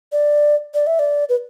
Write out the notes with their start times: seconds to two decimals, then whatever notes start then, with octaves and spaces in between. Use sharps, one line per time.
0.12 D5
0.74 D5
0.87 E5
0.99 D5
1.29 B4